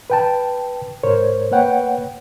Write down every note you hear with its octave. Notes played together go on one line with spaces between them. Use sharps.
B4 G5 A5
G#2 A#4 C5 C#5
A#3 B4 C#5 F#5 G5